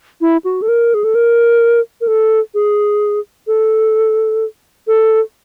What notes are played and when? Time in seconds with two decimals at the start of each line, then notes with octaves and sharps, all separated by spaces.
0.21 E4
0.44 F#4
0.62 A4
0.68 A#4
0.94 G#4
1.04 A4
1.15 A#4
2.01 A#4
2.07 A4
2.54 G#4
3.47 A4
4.87 A4